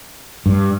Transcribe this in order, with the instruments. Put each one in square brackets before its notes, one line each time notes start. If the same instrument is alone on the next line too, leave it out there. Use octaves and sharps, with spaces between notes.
[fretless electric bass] G2